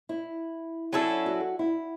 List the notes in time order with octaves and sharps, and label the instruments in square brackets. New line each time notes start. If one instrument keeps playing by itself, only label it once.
[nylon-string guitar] E4
[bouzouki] F#3 C#4 E4 A4 [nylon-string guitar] D4
[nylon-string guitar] F#4
E4